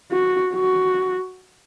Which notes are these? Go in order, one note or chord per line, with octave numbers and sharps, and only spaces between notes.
F#4
F#4